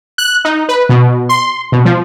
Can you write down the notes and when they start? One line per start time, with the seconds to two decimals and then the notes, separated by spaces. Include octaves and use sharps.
0.18 F#6
0.45 D#4
0.69 B4
0.89 B2
1.29 C6
1.72 B2
1.85 F3